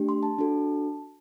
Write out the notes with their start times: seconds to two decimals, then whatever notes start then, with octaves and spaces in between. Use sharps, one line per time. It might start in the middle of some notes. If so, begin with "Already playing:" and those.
Already playing: A3 D4 G4
0.09 C6
0.23 A5
0.39 D4 F#4 A4